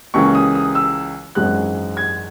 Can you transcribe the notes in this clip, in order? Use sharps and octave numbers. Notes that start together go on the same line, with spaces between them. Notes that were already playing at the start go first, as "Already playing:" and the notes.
C#2 C#3 E3 A#3 C#4 C#6
D#6
D#6
E6
G#1 F#2 E3 G#3 F#6
G#6